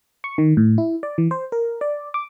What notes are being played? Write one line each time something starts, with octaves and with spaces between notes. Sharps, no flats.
C#6
D#3
A2
E4
D5
E3
C5
A#4
D5
D6